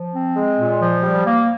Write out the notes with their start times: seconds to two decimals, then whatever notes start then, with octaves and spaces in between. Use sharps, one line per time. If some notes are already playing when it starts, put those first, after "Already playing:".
Already playing: F3
0.15 C4
0.37 G#3
0.59 A#2
0.81 F3
1.04 G3
1.26 A#3